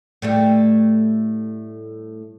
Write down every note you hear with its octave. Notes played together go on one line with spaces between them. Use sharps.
A2 G3 A3